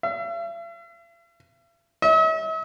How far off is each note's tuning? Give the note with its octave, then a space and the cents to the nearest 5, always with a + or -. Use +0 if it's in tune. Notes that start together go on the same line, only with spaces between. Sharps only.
E5 +45
E5 -45